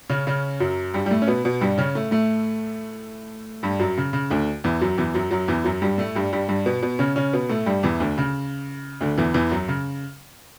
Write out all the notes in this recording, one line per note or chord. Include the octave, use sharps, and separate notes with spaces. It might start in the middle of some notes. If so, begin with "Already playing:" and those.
C#3 C#4
C#3 C#4
F#2 F#3
G2 G3
G3
A2 A3
C#4
B2 B3
B2 B3
G2 G3
C#3 C#4
A2 A3
A2 A3
G2 G3
F#2 F#3
C#3
C#3
D2 D3
E2 E3
F#2 F#3
E2 E3
F#2 F#3
F#2 F#3
E2 E3
F#2 F#3
G2 G3
A2 A3
G2 G3
G2 G3
G2 G3
B2 B3
B2 B3
C#3 C#4
C#3 C#4
B2 B3
A2 A3
G2 G3
E2 E3
D2 D3
C#3
D2 D3
E2 E3
E2 E3
F#2 F#3
C#3